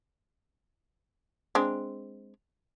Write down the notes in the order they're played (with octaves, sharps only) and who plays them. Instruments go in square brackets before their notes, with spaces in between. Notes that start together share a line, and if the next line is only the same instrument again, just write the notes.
[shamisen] G#3 C4 D4